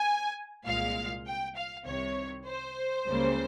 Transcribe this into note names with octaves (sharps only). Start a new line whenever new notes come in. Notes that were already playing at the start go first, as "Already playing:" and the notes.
Already playing: G#5
C2 A#2 G#3 F5
G5
F5
C2 C3 D#3 C#5
C5
C#2 C#3 G3 A#3